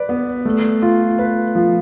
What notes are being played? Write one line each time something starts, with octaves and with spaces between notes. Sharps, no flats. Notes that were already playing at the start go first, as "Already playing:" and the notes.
Already playing: B4 D5
B3
A3
F4
B4
F3